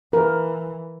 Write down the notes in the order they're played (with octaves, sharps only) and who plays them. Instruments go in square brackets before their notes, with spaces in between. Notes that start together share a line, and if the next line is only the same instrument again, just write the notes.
[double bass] E3 [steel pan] A#4